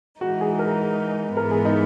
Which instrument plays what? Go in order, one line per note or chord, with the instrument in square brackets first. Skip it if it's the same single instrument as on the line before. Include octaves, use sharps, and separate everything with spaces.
[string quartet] E3 G#3 D#4 [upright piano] F#4
[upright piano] G#4
A#4
[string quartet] G#2 E3 B3 [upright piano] A#4
[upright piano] G#4
D#4